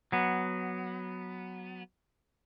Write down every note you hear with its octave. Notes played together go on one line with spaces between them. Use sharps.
F#3 B3